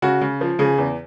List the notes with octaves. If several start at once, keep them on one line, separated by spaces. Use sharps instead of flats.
C#3 F#4
C#3
F3
C#3 G#4
E2